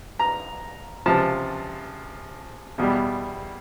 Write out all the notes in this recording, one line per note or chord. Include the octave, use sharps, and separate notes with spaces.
A#5
C#2 C3 F3 A5
E2 B2 G3